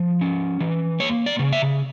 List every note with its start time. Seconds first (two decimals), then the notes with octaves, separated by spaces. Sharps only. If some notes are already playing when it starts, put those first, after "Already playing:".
Already playing: F3
0.21 C#4
0.61 E3
1.00 A#3 C#5
1.26 D5
1.39 C#3
1.53 E5